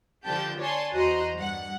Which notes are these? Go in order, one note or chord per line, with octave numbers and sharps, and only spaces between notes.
D3 F3 G4 A5 G6
C#5 D5 G#5 A5 C6
E2 F#4 C5 D#5 A#5 C6
G2 F#5